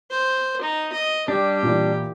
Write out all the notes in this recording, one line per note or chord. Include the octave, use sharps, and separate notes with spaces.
C5
D#4
D#5
G3 D4 G4
A#2 E3